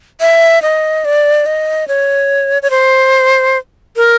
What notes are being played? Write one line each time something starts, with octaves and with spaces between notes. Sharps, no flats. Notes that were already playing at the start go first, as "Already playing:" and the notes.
E5
D#5
D5
D#5
C#5
C#5
C5
A#4